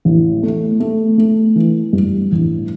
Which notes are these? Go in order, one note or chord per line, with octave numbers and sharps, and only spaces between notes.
A1
A3
A3
A3
E3
G2
A1